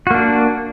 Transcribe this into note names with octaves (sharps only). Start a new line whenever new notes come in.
A#3 D4 F#4